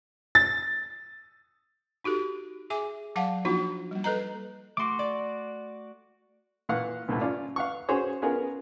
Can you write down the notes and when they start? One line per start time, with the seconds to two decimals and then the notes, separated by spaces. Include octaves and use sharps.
0.35 A6
2.04 D#4 F#4 G4 A4
2.70 G#4 E5 G#5 D6
3.16 F#3 D5 F5 F#5 A5
3.45 F3 A#3 D4 D#4 F4 F#4
3.91 G3 A#3
4.04 A4 B4 D#5 A#5
4.77 A3 F#4 C6 D6
4.99 D5 A6
6.69 A#2 E3 F5 F#5 C#6
7.08 C2 G2 A#2 D3 A3
7.21 C#4 F4 D5
7.56 F5 F#5 C#6
7.89 C#4 F#4 G#4 C5 C#5
8.22 B3 C#4 F4 G#4 A#4